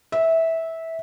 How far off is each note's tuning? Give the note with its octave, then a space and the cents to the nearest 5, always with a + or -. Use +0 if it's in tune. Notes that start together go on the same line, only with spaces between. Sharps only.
E5 -15